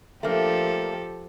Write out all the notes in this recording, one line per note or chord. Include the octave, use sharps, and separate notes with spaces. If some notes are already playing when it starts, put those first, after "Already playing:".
F3 A3 A#3 D4 G4 A4